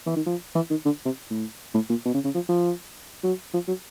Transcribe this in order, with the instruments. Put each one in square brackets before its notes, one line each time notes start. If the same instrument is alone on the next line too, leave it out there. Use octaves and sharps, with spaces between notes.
[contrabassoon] E3
D#3
F3
E3
D#3
D3
C3
A2
A2
A#2
B2
C#3
C#3
F3
F3
F#3
F3
F#3